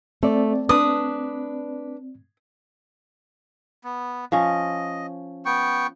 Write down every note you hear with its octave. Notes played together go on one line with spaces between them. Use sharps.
A3 C4 D5
D4 B4 D#6
B3
F3 C#4 D#5
B3 G5 C#6